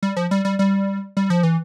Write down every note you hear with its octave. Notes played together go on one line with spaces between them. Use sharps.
G3
F3
G3
G3
G3
G3
F3
E3